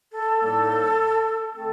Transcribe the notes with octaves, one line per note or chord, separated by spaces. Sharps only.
A4
A2 G3 A#3 D#4
D3 A3 C4 A4